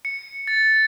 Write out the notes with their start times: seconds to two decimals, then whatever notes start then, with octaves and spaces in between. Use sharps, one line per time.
0.05 C#7
0.48 A6